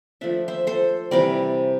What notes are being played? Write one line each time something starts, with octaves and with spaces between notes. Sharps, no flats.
F3 A3 D4 E5
C5 E5
A4 C5
C3 E3 G3 A#4 D5